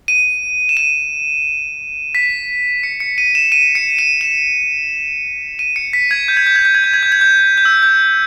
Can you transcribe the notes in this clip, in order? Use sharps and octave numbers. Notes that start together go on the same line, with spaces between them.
D#7
E7
D#7
B6
C#7
C#7
D#7
E7
D#7
C#7
D#7
E7
D#7
C#7
B6
G#6
G6
G#6
G6
G#6
G6
G#6
G6
G#6
G6
G#6
G6
G6
E6
G6